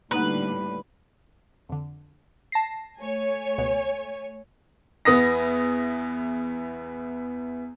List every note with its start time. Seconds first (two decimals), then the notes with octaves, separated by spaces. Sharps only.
0.11 A2 D3 G3 A#3 D#4 B4 F#5
1.69 F2 D3
2.52 A5 A#6 C7
3.01 A3 C#5 G#5
3.58 C#2 B2 B3
5.05 E2 B3 D#6 A#6